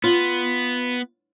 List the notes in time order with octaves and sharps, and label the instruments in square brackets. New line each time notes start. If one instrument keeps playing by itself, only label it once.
[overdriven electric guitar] B3 [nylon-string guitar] F4